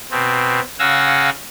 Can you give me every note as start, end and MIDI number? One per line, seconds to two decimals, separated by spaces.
0.11 0.60 47
0.11 0.60 60
0.79 1.30 49
0.79 1.30 77
0.79 1.30 78
0.79 1.30 80
0.79 1.30 88
0.79 1.30 94